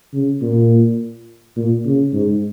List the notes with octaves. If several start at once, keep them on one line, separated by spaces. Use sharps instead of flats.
C#3
A#2
A#2
C#3
G#2